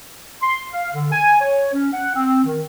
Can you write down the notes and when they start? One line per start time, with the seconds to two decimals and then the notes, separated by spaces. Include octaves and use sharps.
0.41 C6
0.71 F5
0.92 D3
1.12 G#5
1.40 C#5
1.72 C#4
1.92 F#5
2.14 C4
2.45 D#3